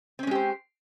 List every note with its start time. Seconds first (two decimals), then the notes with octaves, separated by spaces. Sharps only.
0.19 C4
0.23 C#4
0.27 G#3
0.31 G4
0.35 C5